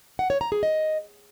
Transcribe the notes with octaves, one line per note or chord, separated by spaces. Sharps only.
F#5
C#5
A#5
G#4
D#5